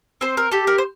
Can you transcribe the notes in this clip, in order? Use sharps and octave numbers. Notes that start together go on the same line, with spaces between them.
C4 C5
A#4
G4 A4
A#4
C5